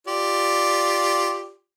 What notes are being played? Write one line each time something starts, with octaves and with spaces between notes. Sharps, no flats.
F4 G4 D5